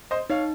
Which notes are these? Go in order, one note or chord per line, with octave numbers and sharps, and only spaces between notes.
C5 D#5
D#4 C#5 F5